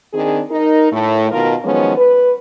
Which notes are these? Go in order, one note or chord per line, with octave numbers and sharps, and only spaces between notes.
D#3 C4 D4 G#4
D#4 A#4
A2 A3
B2 D#3 F4 A#4
D#3 F3 F#3 G#3 B3 C#4
B4